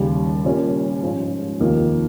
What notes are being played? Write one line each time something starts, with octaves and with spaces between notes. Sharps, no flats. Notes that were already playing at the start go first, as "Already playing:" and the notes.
Already playing: D#2 C#3 G3
A#2 G3 C#4 G4 A#4
G#2 F3 G#3 C#4 F4
F1 D#2 D#3 A#3 F4